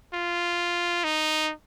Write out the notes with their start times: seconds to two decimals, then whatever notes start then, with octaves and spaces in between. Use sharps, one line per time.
0.14 F4
1.04 D#4